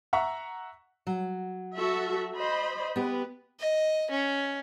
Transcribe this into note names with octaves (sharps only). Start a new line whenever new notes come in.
E5 F#5 A#5 C#6
F#3
F#4 A4 E5
C5 D#5 B5
B3 G4 B4
D#5
C#4